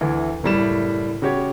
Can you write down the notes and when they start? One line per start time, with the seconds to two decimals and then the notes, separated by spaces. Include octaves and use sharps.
0.01 D2 E3
0.43 F#1 A2 G3 E7
1.22 C#3 F#4 G4 C#5